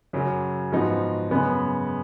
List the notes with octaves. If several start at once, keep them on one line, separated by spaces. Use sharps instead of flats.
F#2 C#3 F#3
G#2 F3 B3 D#4 F#4
F#2 C#3 G#3 B3